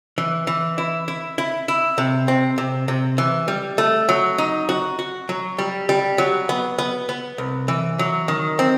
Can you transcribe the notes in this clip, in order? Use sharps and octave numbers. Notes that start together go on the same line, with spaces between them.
E3
E3
E4
E4
E4
E4
C3
C4
C3
C3
E3
G3
A3
F#3
D#4
F#4
F#4
F#3
G3
G3
F#3
B3
B3
B3
C2
E3
F#3
D#3
C4